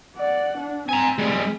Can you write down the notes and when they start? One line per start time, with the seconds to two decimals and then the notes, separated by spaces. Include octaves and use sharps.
0.16 D5 F#5
0.58 D4
0.89 C4 G#5 A#5
1.18 G3 G#3